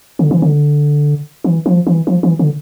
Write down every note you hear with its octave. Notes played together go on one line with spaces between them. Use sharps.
D3
E3
D3
E3
F3
E3
F3
E3
D3